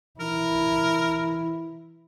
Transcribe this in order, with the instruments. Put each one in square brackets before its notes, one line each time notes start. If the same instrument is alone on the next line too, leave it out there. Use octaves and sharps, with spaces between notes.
[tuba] E3 [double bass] E4 [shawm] A#4